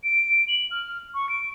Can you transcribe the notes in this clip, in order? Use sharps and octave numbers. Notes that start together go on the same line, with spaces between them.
D7
F#7
F6
C#6
D7